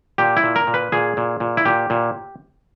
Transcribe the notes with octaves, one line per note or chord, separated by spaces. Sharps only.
A#2 G4
E4
A#2
A#4
A#2
B4
A#2 G#4
A#2
A#2
E4
A#2 G4
A#2